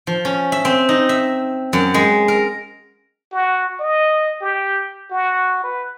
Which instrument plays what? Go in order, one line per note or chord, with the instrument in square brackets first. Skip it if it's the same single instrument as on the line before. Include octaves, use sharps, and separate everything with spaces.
[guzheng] F3
C#4
E5
C4
D#4
E5
F#2
G#3
A#4
[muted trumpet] F#4
D#5
G4
F#4
B4